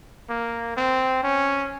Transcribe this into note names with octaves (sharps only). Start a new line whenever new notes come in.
A#3
C4
C#4